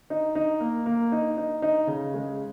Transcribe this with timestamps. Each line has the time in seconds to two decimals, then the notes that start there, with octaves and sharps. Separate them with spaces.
0.10 D#4
0.35 D#4
0.60 A#3
0.86 A#3
1.12 D#4
1.37 D#4
1.62 D#4
1.87 C#3
2.14 G#3